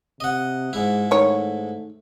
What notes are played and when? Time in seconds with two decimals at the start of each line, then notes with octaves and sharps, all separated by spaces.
0.20 C3 D#5 F#5
0.73 G#2 G#3 E4
1.11 D#3 A3 C#5